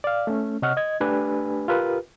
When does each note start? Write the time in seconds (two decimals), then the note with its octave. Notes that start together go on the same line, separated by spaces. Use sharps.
0.04 D5 F5
0.27 A3 C#4
0.62 C3 C#5 D#5 F#5 C#6 F6
0.77 D#5 G#6
1.01 A3 D4 G4 B4 G#5 B5
1.68 F4 G4 A#4 B4